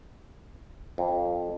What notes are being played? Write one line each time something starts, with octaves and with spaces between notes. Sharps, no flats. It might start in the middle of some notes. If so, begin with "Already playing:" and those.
F2